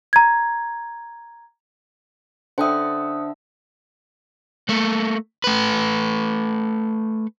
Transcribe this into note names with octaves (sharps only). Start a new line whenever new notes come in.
A#5 G#6
D3 C5 E5 G5 D#6
A3 A#3
A3 B4